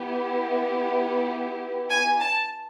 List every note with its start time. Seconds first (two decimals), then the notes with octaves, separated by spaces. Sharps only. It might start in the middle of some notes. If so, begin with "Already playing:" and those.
Already playing: B3 E4 G4
1.90 G#5
2.20 A5